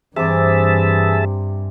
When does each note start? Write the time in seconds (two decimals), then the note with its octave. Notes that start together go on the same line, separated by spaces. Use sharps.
0.16 G2 C3 E3 G#4 E5 G#5 A5 D6